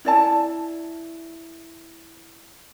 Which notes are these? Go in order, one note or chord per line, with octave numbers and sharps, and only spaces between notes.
E4 D5 A5